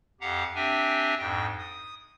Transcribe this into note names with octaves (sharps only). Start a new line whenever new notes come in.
F2 G4 F5 F#5 A#5
C4 D4 G4 E5 G5 G#5
F2 G#2 G5 A#6
D#6